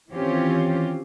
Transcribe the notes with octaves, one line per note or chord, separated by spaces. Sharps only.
D#3 E3 C4 C#4 F4 G4